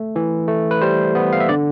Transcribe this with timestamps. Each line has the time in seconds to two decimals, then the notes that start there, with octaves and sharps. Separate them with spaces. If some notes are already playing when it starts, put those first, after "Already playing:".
Already playing: A3
0.16 E3
0.48 A3
0.71 B4
0.82 G3 C5
1.15 B3
1.33 F5
1.40 E5
1.49 D3 D5